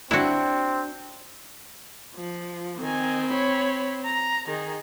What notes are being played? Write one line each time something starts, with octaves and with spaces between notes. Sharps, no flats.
C4 D4 E4 F#4
F3
D#3 C4 G#5
C#5 B5
A#5
D#3 G#4